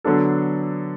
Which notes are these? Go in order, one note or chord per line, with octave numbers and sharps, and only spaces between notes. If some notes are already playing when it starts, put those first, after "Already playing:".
D3 F#3 B3 D4 A4